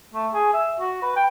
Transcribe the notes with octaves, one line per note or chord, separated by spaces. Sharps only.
A3
G#4
E5
F#4
B4
G5